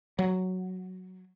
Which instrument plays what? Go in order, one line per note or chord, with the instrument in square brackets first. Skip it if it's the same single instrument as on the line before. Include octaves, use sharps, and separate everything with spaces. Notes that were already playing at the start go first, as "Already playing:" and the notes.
[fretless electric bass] F#3